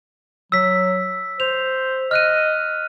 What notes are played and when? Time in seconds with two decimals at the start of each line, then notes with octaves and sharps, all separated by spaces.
0.52 F#3 E6 B6
1.40 C5 F7
2.11 D#5 F6 F#6 D#7